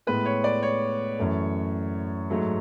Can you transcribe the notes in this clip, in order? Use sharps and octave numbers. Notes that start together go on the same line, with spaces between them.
A2 G#3 B3 B4
C#5
D5
C#5
F#2 E3 A3
G#2 F#3 A3